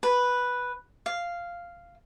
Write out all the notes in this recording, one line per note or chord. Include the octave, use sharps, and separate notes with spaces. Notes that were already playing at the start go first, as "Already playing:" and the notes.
B4
F5